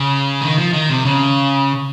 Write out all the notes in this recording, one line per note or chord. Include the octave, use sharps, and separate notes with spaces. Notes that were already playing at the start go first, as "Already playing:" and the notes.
Already playing: C#3
D#3
F3
D#3
C3
C#3